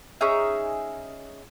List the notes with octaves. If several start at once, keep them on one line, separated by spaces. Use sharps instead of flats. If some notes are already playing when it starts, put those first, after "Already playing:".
C#4 D#4 G#4 E5